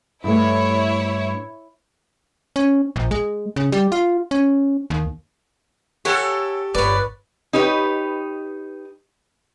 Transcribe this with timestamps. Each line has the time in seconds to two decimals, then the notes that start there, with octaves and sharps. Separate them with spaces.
0.24 G2 A3 E4 C#5
2.56 C#4
2.96 A#1
3.11 G#3
3.56 C#3
3.72 G3
3.92 F4
4.31 C#4
4.90 D#2
6.05 G4 A4 C#5 F#5 G#5
6.74 G1 F4 B4 C#5 D5
7.53 D#4 G4 B4 C#5